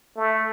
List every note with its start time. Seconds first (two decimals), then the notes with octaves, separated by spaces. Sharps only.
0.17 A3